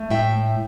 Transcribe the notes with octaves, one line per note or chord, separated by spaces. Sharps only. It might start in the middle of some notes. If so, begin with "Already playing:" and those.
Already playing: A3
A2 E5 G5